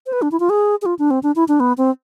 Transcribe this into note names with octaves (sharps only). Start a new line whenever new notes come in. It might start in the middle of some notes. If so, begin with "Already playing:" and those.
C5
B4
D4
E4
F4
G#4
G#4
F4
D4
C4
D4
E4
D4
B3
C4